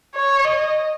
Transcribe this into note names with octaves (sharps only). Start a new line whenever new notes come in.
C#5
D#5